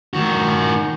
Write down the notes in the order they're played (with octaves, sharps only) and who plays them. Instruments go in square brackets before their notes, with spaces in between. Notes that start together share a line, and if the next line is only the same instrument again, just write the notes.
[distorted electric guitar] D#3 F#4